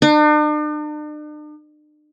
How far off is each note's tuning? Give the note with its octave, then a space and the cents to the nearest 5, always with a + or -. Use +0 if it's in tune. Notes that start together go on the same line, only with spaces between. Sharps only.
D4 +45